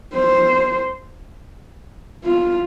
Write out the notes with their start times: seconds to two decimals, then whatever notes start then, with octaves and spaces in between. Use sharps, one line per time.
0.14 C5
2.24 F4